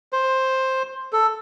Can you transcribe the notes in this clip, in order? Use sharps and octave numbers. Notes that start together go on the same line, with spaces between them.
C5
A4